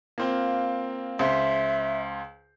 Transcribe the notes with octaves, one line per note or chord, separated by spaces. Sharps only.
A#3 C4 F4
C#2 C5 E5